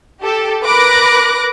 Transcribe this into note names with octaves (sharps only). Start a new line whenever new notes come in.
G4 A4
A#4 B4 B5 D6 F#6 A#6